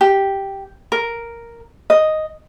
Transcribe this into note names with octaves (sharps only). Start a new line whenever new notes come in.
G4
A#4
D#5